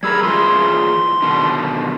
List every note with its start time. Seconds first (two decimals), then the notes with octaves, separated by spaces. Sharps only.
0.03 G3 G#4 A#4 B5 E6 G#6
0.23 E3 F4 G#4 C6
1.22 B2 D3 D#3